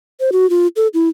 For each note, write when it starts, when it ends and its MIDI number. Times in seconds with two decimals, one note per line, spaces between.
0.20 0.30 72
0.32 0.49 66
0.50 0.67 65
0.76 0.87 69
0.94 1.09 64